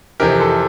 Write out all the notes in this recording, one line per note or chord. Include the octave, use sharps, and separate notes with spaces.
F2 C3 E3 G4 A#4
A4 C5